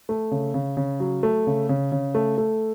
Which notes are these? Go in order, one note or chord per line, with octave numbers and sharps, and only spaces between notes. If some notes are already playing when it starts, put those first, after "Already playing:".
A3
C#3
C#3
C#3
F#3
A3
C#3
C#3
C#3
A3
A3